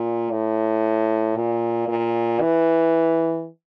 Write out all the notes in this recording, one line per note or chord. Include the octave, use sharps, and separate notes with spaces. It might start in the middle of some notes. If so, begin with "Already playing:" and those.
Already playing: A#2
A2
A#2
A#2
E3